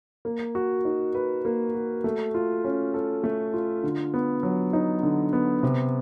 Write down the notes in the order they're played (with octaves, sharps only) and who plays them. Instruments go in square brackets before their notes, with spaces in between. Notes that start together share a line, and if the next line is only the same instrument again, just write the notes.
[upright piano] A#3
F#4
D#4
B4
A#3
F#4
A3
F4
C#4
A4
A3
F4
D3
B3
F#3
D#4
D3
B3
C3